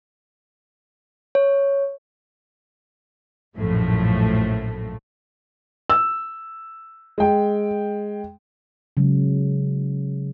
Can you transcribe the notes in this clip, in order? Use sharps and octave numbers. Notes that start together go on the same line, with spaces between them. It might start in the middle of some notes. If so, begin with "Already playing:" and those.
C#5
A#1 F#2 A2 F3 A3
E6
G#3 G5
C#3 F#3 G#3